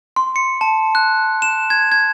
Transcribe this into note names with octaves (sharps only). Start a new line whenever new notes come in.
C6
C#7
A5
F#6
E7
G#6
G#6